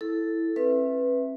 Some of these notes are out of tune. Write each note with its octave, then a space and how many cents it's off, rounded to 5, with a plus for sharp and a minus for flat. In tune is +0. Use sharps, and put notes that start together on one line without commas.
E4 +0 A4 +0
C4 +45 B4 +0 E5 -5